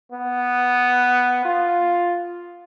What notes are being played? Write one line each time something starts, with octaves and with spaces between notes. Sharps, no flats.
B3
F4